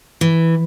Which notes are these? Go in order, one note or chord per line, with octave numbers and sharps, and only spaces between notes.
E3